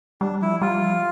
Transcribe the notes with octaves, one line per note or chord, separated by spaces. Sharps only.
G3 D4
F3 E4
G3 F4
F3